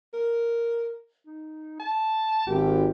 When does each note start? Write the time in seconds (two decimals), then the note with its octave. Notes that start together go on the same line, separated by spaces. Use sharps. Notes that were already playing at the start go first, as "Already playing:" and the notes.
0.14 A#4
1.26 D#4
1.80 A5
2.47 G#1 G4